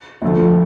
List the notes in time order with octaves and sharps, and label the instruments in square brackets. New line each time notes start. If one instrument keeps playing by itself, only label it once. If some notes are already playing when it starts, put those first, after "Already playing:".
[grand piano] D2 D3 A3 [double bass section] F3